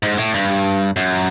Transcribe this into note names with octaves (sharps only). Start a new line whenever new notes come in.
G#2
A2
G2
F#2